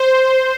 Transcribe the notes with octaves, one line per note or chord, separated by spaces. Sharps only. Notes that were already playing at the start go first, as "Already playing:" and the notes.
Already playing: C5